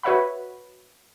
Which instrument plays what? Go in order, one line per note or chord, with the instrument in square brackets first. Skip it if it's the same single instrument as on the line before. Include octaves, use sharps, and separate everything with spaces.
[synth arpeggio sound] F#4 B4 C#5 E5 F#5 B5